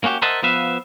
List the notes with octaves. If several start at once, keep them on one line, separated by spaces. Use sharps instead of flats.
A#3 C#4 F#4 G4
A#4 C5 D#5 E5 F#5 A5
F3 B3 B4 E5 F5